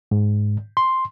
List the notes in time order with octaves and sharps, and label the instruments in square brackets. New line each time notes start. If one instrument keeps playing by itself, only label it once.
[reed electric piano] G#2
C6